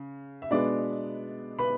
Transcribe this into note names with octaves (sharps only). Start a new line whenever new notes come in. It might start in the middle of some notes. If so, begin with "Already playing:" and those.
Already playing: C#3
E5
B2 G#3 B3 D4 D5
B4 B5